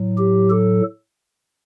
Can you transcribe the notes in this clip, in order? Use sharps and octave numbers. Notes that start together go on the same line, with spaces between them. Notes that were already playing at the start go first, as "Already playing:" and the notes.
Already playing: A2 F#3
G4
A4